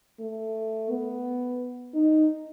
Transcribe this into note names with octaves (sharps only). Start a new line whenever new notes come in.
A3
B3
D#4